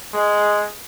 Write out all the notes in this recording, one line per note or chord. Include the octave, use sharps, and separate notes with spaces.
G#3